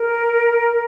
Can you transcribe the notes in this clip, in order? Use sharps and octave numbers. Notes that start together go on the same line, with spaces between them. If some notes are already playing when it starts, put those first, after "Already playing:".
Already playing: A#4